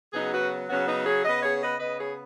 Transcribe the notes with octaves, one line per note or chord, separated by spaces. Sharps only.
C#3 F#3 B3 D#4 G#4
F#4 B4
C#3 F#3 B3 C#4 F#4
B3 D#4
G#4 C#5
C#3 B3 B4 D#5
G#4 C#5
C#5
B4 D#5
C#3 B3 B4 D#5
G#4 C#5